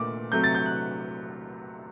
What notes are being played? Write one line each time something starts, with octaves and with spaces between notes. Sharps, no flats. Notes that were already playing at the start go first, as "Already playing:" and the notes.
Already playing: A#2 A3 D6
C3 F#3 A3 G6
A6
G6
F#6